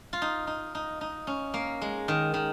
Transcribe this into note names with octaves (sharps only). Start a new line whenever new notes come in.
F4
D#4
D#4
D#4
D#4
C#4
A#3
G#3
D#3
D#3